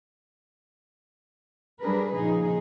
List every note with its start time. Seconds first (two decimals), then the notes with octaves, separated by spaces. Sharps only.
1.80 F#3 G3 D4 G#4 A#4 B4
2.14 A#2 C#3 F3 D#4 G#4